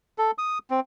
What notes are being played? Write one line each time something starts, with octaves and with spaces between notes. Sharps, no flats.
A4
D#6
C4